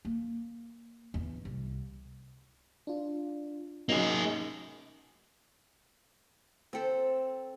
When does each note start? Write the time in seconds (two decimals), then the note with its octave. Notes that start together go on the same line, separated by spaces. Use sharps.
0.05 A#3
1.14 E2
1.45 C2
2.87 D4 F4
3.89 A#3 C#4 D#4 F#4 G#4
6.73 C4 A4